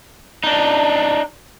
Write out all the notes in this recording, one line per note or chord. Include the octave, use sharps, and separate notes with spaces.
D4 D#4